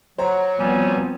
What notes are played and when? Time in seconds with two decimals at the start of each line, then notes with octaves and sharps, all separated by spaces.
0.18 F#3 C5 C#5 A#5
0.59 F3 G3 B3 C4 G#5